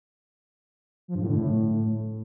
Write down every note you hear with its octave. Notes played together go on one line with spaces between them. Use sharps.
F3
G2
A2
D3
A2